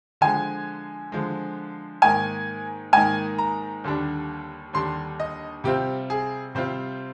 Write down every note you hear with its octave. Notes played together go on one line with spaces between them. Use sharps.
D3 F3 G#3 G#5
D3 F3 G#3
G#2 D#3 A#3 D#4 G#5
G#2 D#3 A#3 D#4 G#5
A#5
D#2 D3 G3 D4
D#2 D3 G3 D4 C6
D#5
C3 G3 C4 F4 G4
G#4
C3 G3 C4 F4 C5